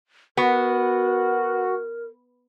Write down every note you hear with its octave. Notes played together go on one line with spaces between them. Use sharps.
B3 F#4 A#4